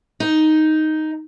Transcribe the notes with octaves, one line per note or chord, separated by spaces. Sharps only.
D#4